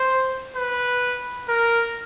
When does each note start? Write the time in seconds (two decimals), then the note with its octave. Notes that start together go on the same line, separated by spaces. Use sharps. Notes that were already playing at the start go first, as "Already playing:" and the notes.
Already playing: C5
0.56 B4
1.49 A#4